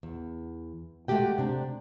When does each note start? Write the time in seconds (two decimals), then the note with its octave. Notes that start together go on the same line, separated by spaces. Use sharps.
0.03 E2
1.08 G#3 A3 C4 F#4 G4 G5
1.38 C3 D4